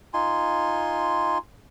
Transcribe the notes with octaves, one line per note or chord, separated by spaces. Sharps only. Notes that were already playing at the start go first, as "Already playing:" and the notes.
D#4 F4 G#5 C6